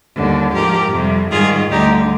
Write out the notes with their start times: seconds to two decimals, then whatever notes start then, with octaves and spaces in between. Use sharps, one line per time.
0.15 D#2 D3 G3
0.53 G#2 F3 G4 A#4
0.92 F2 C3 G3
1.31 G#2 D#3 G3 F4 G#4
1.71 D2 D3 G3 D#4 G4